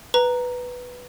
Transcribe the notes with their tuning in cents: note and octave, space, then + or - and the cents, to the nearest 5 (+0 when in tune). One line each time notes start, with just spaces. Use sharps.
B4 +0 A#5 +0